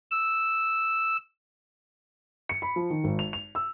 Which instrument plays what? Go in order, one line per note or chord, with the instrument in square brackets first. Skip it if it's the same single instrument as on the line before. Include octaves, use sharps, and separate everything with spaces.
[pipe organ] E6
[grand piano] C#7
B5
F3
D#3
G#1
F7
F7
E6